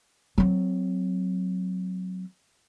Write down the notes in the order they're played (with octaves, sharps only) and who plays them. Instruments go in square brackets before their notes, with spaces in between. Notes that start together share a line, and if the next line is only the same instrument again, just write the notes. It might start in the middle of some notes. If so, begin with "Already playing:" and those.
[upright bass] F#3 C4